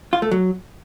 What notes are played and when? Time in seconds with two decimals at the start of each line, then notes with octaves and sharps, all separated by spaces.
0.13 F4
0.22 A3
0.31 F#3